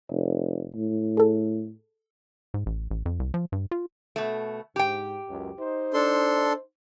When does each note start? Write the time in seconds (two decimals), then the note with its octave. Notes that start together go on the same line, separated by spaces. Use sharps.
0.11 F1
0.75 A2
1.17 G#4 A4
2.54 G#2
2.66 A1
2.91 A1
3.05 F2
3.19 C2
3.34 F3
3.52 G2
3.71 F4
4.16 B2 A3
4.76 G#2 G4 G5
5.29 C#2 F#2
5.60 D#4 C5
5.94 D4 A4 C6